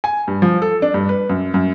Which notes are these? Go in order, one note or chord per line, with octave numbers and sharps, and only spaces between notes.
G#5
G2
F3
A4
D4
G2
B4
F#2
F#2